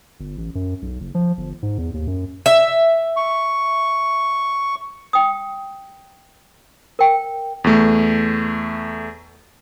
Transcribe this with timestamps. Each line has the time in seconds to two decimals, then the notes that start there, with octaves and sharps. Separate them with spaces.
0.20 G1
0.38 A1
0.55 F#2
0.82 B1
1.00 F#1
1.15 F3
1.37 G1
1.63 G#2
1.78 E2
1.94 D#2
2.07 F#2
2.46 E5
3.16 C#6
5.13 G5 D#6
6.99 A#4 G5
7.64 E2 A3